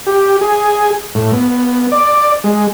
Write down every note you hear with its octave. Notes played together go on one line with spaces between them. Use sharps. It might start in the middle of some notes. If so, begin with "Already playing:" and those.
G4
G#4
A2
B3
D5
G#3